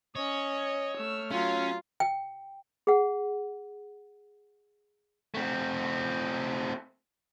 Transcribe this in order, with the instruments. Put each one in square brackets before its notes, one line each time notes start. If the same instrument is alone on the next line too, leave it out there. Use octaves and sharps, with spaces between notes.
[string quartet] C#4 [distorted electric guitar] C#5 [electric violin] D#5
[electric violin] A3 F6 [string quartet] E6
[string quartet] F#3 [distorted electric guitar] C#4 [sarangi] F4
[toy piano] G5
G#4 F#5
[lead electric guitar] A3 C4